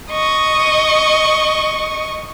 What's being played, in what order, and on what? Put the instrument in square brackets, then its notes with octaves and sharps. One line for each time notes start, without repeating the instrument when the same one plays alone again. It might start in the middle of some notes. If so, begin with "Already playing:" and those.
[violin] D#5 C#6